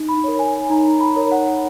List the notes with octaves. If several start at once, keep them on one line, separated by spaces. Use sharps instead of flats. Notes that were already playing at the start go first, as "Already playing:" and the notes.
Already playing: D#4
B5
A#4 C#5
G#5
D#4 A#5
B5
A#4 C#5
F#5